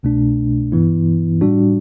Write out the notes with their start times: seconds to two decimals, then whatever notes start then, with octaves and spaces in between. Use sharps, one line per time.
0.03 C2 B2 A3 D4
0.72 G2 E3 B3 E4
1.41 A2 G3 D4 F#4